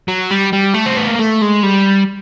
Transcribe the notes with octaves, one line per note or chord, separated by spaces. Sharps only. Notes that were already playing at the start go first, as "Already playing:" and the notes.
F#3
G3
G3
A3
C4
B3
A#3
A3
G#3
G3